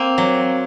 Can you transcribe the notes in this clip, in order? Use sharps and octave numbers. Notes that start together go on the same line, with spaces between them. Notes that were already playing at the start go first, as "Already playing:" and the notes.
Already playing: A#3 C4
F#3